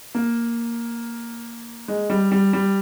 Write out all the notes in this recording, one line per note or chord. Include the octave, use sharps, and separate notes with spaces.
A#3
G#3
G3
G3
G3